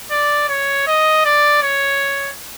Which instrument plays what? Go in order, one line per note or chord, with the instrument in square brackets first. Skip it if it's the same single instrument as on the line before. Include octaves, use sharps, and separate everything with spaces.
[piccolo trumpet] D5
C#5
D#5
D5
C#5